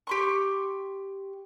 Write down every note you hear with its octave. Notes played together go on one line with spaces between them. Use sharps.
G4 C6 C#6